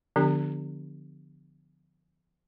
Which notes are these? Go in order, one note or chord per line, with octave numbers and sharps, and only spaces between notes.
D3 F3 B3 D4 G4